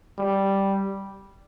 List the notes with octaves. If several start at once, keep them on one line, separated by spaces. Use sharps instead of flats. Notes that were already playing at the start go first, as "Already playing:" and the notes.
G3